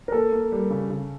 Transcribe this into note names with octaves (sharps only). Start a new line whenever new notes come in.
A#4
A#3 A4
A#3
G3
C#3
C#3